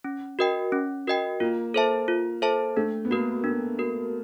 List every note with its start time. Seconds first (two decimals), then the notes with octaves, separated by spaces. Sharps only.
0.04 C#4
0.39 F#4 A#4 D#5 G5
0.72 C#4
1.07 F#4 A#4 D#5 G5
1.40 A#3 F4
1.74 A4 C5 E5 A5
2.08 F4
2.42 A4 C5 E5 A5
2.76 A3 D4
3.05 B3
3.10 A#3 F#4 A#4
3.44 B3 D4
3.79 F#4 A#4